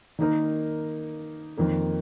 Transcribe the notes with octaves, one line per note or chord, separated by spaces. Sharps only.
D#3 A#3 D#4 A#4
F2 D#3 A#3